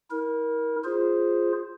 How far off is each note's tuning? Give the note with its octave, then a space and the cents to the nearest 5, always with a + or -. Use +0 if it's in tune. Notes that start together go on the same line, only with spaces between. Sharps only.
E4 -35 A#4 +15
F4 +0 G#4 +0 C5 +0